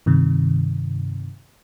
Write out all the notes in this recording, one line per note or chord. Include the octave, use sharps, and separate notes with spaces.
G2 C3 D#3